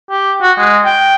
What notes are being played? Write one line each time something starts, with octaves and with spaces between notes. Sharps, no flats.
G4
F#4
G#3
G5